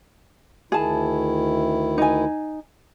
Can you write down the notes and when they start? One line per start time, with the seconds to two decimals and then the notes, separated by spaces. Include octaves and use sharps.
0.72 D2 D#3 E4 G#4 A5
1.98 D#4 G#5